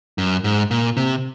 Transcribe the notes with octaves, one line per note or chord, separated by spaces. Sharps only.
F#2
G#2
A#2
C3